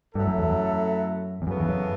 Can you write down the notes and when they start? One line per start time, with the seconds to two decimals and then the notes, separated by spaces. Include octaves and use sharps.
0.15 G2 F#3 A3 E4 A4
0.28 F#2
0.38 E2
0.50 F#2
1.42 E2
1.46 F#2 C#3 E3 B3 F#4 A4
1.60 E2
1.69 F#2